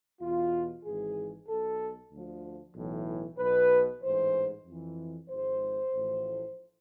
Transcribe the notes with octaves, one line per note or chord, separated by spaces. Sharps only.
E2 B2 F4
G#1 G#2 E3 G#4
B1 B2 A4
D2 D3 F3
B1 A2 E3
B1 B2 B4
A1 G#2 E3 C5
F2 E3
G#1 G#2 F3 C5
A1 A2 F3